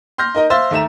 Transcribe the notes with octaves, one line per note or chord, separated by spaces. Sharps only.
C6 F6 G6 A#6
D#4 A#4 D#5
C5 E5 F5 C6 E6 A6
D#2 A3 E5 A#5 E7